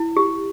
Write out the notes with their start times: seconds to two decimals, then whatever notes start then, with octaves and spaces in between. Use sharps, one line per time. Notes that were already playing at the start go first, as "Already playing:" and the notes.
Already playing: E4
0.17 G4